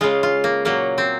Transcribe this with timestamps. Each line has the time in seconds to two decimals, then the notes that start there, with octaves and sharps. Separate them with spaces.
0.01 C#3 G#3 F4
0.23 F4
0.44 A#3
0.65 A#2 F#3 A#3
0.98 C4